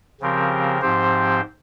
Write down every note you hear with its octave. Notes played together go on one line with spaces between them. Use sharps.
C#3 F3 C4 G4 A#4
G#2 F3 C4 G4 C5